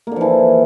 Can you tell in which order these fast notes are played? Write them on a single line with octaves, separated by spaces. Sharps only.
A#3 D3 F3 E3